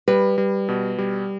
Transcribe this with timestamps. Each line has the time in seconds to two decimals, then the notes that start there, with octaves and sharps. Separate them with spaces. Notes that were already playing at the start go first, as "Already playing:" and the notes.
0.08 G3 B4
0.38 G3
0.69 B2
0.98 G3